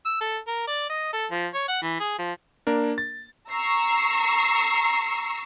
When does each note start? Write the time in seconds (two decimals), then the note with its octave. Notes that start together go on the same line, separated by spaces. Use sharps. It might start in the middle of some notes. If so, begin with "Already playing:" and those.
0.05 E6
0.21 A4
0.48 A#4
0.67 D5
0.90 D#5
1.13 A4
1.31 F3
1.54 C#5
1.68 F#5
1.82 E3
2.00 G#4
2.19 F3
2.67 A#3 D4 A#4
2.98 A6
3.49 A#5 C#6 E6 C7